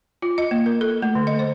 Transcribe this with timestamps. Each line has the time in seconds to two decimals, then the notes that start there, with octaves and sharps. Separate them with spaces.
0.22 F4
0.38 D#5
0.51 A#3
0.66 A#4
0.81 A4
1.02 A3
1.15 D3
1.27 D#5
1.39 C5